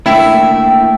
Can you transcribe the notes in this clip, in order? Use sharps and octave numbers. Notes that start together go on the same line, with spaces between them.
A3 A#3 D4 E4 G5